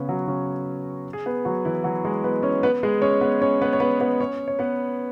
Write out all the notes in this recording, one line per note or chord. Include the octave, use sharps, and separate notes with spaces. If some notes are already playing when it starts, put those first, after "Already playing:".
Already playing: C#3 B3 C#4 B4
F#3 F#4
C#3 C#4
G#4
B3 B4
F#3 F#4
E3 E4
F#3 F#4
G#3 G#4
B3 B4
C#4 C#5
B3 B4
G#3 G#4
C#4 C#5
B3 B4
C#4 C#5
B3 B4
C#5
B3 B4
B3 B4
C#4 C#5
C#5
B3 B4